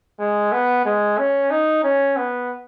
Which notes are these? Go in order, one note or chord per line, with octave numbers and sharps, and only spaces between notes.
G#3
B3
G#3
C#4
D#4
C#4
B3